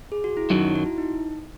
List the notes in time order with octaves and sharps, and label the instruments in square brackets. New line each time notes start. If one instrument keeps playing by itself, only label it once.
[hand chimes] G#4
F#4
E4
[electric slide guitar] F#2 D#3 F#3 [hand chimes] D#4
[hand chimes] F#4
E4
D#4